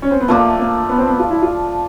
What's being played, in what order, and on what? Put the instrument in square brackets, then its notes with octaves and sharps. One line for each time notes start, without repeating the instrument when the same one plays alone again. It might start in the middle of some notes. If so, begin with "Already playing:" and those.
[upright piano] C#4
C4
B3
[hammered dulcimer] F3 A3 D4 [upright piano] A#3
[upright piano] A#3
B3
C4
B3
F4
E4
F4